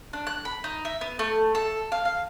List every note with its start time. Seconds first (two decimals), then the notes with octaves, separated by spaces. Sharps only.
0.13 D4
0.27 F#6
0.45 B5
0.64 D#4
0.85 E5
1.01 B3
1.19 A3
1.55 A4
1.92 F5
2.05 F5